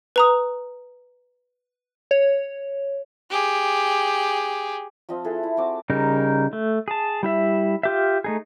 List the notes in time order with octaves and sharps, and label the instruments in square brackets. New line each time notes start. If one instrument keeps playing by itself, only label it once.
[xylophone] B4 A#5 D#6
[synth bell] C#5
[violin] G4 G#4
[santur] F3 C4 D#5 F5
E4 G#4 A4 B4
E4
C4 F#4 D6
[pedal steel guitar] C#3 G3 D#4 A#4
A3
G#4 A5
G3 E4 E5
F4 G4 E5
A3 D#4 G#4